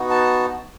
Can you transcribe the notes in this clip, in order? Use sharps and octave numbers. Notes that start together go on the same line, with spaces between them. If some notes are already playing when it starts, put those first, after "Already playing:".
Already playing: B3 D#4 F#4
A5